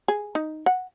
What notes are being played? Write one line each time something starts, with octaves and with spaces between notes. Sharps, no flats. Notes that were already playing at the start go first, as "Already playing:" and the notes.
G#4
D#4
F#5